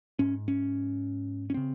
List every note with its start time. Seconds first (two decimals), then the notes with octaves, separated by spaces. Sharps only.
0.19 G#2 C#4
0.48 C#4
1.50 C#4
1.54 C#3 C4